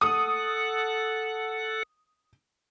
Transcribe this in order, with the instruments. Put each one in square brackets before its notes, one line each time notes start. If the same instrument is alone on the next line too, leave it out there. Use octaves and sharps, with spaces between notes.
[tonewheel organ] A4 F#5 [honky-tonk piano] D#6